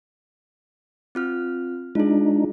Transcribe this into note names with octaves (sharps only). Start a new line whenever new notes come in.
C4 F4 F6
G#3 D4 D#4 F4 G#4